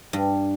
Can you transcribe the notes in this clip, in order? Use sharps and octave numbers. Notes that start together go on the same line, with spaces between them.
G2